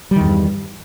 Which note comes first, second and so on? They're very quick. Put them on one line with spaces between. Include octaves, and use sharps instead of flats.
G3 D#3 E2 G2